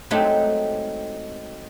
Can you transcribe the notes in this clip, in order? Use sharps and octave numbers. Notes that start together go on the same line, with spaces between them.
F#3 G#3 A3 C4 D#4 G4